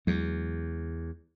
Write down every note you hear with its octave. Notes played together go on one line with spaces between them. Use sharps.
E2 F#3 G#3